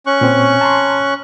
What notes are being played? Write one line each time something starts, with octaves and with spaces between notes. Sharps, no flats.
C#4 C#6 F#6
A#2 C4
A5 A#5 C6